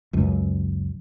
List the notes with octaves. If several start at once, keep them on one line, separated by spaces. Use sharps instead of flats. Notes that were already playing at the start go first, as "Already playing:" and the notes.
C#2 F#2